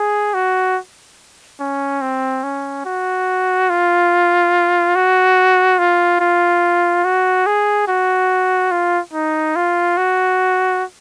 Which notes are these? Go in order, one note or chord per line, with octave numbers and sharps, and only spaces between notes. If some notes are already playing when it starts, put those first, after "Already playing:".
Already playing: G#4
F#4
C#4
C4
C#4
F#4
F4
F#4
F4
F4
F#4
G#4
F#4
F4
D#4
F4
F#4